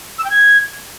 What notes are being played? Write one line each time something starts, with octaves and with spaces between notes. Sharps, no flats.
E6
G5
G#6